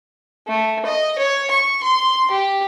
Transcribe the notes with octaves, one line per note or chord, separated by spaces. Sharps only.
A3
D#5
C#5
C#6
C6
G4